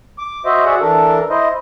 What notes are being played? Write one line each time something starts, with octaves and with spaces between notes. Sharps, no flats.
D6
F#4 C5 D#5 E5
F#4 G#4 D5 E5 F#5
E3 D4 A4 A#4
E4 C5 D#5